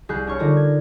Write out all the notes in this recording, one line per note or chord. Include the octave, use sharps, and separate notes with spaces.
C2 G#4 B5 F#6 G6 C7
D4 C#5 C#6 F6
D3 G3 D4 D#4 F4 A#4
G#6